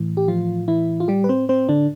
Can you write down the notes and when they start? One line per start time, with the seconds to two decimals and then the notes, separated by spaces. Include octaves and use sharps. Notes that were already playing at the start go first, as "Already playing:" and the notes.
Already playing: A2 E3
0.17 G4
0.28 F3 F4
0.68 E3 E4
1.00 F4
1.08 G3 G4
1.24 B4
1.29 C4 C5
1.49 C4 C5
1.69 D3 D4